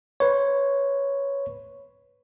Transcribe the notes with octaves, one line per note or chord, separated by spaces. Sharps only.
B4 C#5